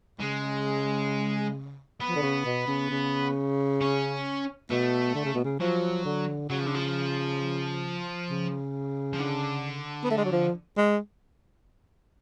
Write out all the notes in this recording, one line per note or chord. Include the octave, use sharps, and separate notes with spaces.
C#3 G#3
B3
F3
D3
C#3
B2
C#3
C#3
C#4
B2 A3
D3
C#3
B2
C#3
F3 F#3
D3
C#3 F#3
F3
D3
F3
C#3
F3
D3
B3
A3
G#3
F#3
F3
G#3